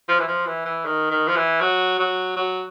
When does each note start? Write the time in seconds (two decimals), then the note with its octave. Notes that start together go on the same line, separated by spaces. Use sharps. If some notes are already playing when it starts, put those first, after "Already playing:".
0.09 F3
0.19 E3
0.28 F3
0.47 E3
0.65 E3
0.85 D#3
1.11 D#3
1.28 F3
1.36 E3
1.61 F#3
1.99 F#3
2.36 F#3